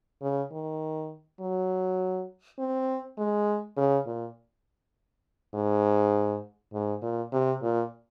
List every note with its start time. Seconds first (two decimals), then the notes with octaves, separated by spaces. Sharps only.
0.22 C#3
0.52 D#3
1.40 F#3
2.59 C4
3.18 G#3
3.77 C#3
4.06 A#2
5.54 G#2
6.73 G#2
7.02 A#2
7.32 C3
7.62 A#2